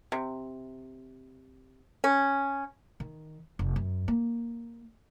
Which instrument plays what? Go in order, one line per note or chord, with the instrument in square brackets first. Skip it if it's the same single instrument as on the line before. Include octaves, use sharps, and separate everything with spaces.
[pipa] C3
C#4
[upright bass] D#3
F1
F#2
A#3